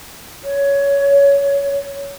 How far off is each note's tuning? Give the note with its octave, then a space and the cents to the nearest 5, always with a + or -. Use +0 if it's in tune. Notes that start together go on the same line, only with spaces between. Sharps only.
C#5 +15